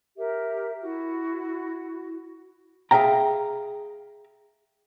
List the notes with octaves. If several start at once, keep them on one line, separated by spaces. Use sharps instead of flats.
G4 A#4 E5
E4 F#4
G#4 E5 F5 G5 A#5